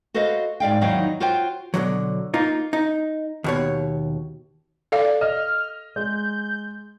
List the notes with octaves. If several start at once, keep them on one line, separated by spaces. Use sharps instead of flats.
F#4 A4 B4 C5 D#5 F5
G#2 D5 F5 G5
E2 D#3 F#3 D#4 F5 G5
F4 F#4 C5 C#5 G5
B2 D3 E3 F#3
A#3 D#4 F4
D#4
D#2 B2 C#5
A4 D5 F5
D#5 F6
G#3 G6